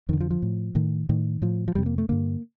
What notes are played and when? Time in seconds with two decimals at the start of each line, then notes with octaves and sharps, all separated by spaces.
0.09 F2 D3 D#3
0.20 F3
0.30 F3
0.42 A2
0.75 A2 D#3
1.09 A2 D#3
1.42 A2 F3
1.68 F3
1.75 F2 C3 G3
1.86 A#3
1.98 A3
2.09 G2 D3 A#3